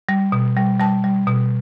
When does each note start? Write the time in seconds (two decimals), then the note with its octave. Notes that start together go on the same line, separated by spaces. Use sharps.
0.09 G3
0.32 B2
0.57 G3
0.80 G3 A5
1.04 G3
1.27 B2